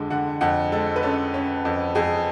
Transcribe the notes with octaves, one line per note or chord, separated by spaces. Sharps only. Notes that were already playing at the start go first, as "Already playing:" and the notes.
Already playing: F2 D3 G#3
D3 F#5
F2 F#5
G#3 A4
B4
C#4 A4
C#4
F2
F2 G#4